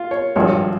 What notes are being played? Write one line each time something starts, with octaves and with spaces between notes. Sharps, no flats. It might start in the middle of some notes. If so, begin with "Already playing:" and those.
Already playing: F4
C#5
G#1 G2 F3 C#5